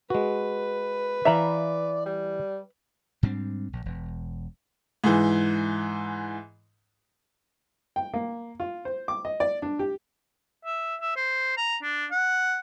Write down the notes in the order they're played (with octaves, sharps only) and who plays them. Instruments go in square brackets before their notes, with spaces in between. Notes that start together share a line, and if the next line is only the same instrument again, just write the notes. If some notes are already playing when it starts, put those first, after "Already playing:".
[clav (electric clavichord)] G#3 F#4 [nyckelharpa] B4
[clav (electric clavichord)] E3 F5 [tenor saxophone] D5 [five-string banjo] E5 A#5 B5
[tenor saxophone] G3
[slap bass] G#2 G3 C4 D4
A#1
E1
[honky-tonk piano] G#2 E3
[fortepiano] G5
A#3
F4
C5
D6
D#5
D5
D4
G4
[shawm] E5
E5
C5
A#5
D4
F#5